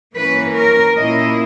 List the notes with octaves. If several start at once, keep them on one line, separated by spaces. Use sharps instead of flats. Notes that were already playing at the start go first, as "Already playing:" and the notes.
E3 A#3 C#4 B4
A#4
A#2 A#3 C#4 E4 D#5